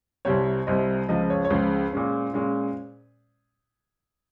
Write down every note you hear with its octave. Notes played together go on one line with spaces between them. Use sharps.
C2 C3 G3 C4 C#5
C2 C3 G3 C4 D#5
C#2 C#3 F3 D#5
C#5
C#5
C#2 C#3 F3 C5
A#2 G#3 C#4
A#2 G#3 C#4